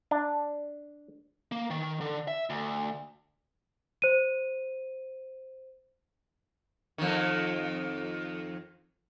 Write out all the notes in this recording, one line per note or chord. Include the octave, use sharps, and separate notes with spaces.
D4
A#3
D#3
D3
E5
D2
C5 D#7
F2 D#3